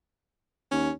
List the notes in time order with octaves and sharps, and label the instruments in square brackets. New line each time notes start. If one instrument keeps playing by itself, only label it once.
[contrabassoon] D#2 [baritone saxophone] C#4